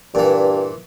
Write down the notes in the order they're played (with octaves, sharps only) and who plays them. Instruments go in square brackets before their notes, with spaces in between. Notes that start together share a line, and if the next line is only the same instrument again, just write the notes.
[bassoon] G2 [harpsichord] A#2 E3